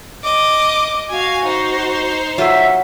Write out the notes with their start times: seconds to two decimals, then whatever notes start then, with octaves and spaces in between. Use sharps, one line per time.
0.24 D#5 D6
1.10 F#4 F5 G#5
1.45 D#4 C5
2.38 F#3 F4 B4 E5